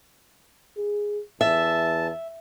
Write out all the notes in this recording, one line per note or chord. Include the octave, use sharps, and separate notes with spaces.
G#4
E2 E5 A5